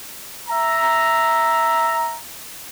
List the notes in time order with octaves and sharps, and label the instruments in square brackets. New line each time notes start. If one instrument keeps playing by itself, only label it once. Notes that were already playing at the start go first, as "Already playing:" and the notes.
[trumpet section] E5 A#5